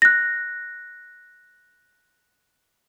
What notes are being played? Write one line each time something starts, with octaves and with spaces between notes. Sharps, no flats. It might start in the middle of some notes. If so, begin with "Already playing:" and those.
F#6 A#6